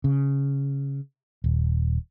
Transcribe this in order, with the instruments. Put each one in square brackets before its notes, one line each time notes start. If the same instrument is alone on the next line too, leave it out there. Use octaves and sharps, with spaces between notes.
[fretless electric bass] C#3
D#1